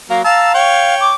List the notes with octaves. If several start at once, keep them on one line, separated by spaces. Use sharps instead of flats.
F#3 A#3 A#4 F5
F5 A5 A#5 E6
C#5 G5 C#6
D6